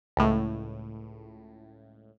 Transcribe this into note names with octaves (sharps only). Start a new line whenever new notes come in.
C#2 A2